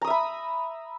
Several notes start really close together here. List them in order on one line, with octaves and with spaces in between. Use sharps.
A#5 D#6 E5 B5